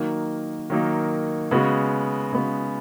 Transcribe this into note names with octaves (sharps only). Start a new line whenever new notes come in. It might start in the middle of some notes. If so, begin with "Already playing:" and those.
Already playing: D#3 F#3 A#3 D#4
D#3 F#3 A#3 D#4
C#3 G#3 B3 F#4
C#3 G#3 B3 F#4